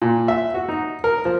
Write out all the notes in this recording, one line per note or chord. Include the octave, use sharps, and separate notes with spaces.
A#2
E5
F#4
D#4
A#4
F3